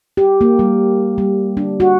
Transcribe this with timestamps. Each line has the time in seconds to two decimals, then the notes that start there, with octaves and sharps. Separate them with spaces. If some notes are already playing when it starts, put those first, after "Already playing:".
0.17 G4
0.41 A#3
0.59 G3
1.18 G3
1.57 D4
1.80 F#4